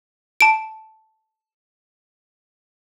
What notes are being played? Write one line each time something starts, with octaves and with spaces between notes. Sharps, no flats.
A5 D7